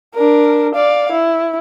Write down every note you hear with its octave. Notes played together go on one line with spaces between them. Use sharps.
D4 A#4
D5 F5
E4